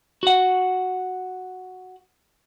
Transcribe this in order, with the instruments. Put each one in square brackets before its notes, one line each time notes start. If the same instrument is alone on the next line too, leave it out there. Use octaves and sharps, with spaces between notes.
[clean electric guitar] F#4 F#5